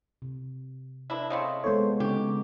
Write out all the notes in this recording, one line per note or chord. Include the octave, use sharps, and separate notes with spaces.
C3
D4 E4 B4 E5
C#3 A3 C4 C#5 D#5 F5
G#3 B3 E4 A4 C5 C#5
C#3 C4 D4 D#4 G4 C#6